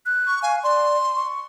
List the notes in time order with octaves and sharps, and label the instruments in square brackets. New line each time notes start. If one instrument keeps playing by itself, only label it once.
[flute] F#6
[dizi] C#6
[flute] F5 [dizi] G#5
[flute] D5 [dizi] C6
[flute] C#6